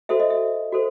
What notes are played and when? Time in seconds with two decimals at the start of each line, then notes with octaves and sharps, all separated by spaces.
0.09 F#4 A4 C5 E5
0.20 D#5
0.30 E5
0.72 F#4 A4 C5